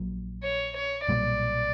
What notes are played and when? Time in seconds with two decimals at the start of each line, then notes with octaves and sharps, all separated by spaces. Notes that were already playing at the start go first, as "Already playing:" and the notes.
Already playing: A#1 A#2 F#3
0.43 C#5
0.76 C#5
1.07 B1 A#2 G3 D5